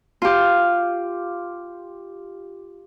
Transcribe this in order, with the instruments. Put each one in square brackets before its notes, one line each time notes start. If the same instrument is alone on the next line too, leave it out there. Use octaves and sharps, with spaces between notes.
[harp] F4 G4